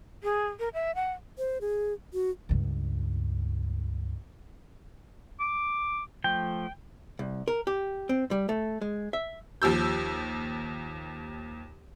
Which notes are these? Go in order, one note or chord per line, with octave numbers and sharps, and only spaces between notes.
G#4
A#4
E5
F#5
C5
G#4
F#4
C#2 G2
D6
F3 A3 G5
C2
A#4
G4
C4
G3
A3
G#3
E5
D#2 F3 E6 G6